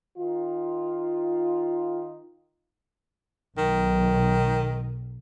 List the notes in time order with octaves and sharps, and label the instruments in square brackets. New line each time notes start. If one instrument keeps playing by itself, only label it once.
[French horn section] D#3 D#4 F4
[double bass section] B1 [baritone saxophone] D#3